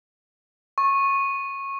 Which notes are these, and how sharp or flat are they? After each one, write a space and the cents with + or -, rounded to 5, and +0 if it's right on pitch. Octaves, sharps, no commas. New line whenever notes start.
C#6 -20